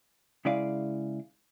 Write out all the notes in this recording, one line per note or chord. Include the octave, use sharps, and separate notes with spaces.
C#3 G#3 E4 G#4 D5 F5